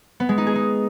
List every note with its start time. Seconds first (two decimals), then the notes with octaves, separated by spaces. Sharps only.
0.20 B3
0.29 G#3
0.38 D#4
0.47 G#4
0.55 D#4